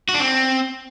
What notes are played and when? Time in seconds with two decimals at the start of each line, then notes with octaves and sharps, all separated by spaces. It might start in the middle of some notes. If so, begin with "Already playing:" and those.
0.09 F#4
0.14 D4
0.20 C4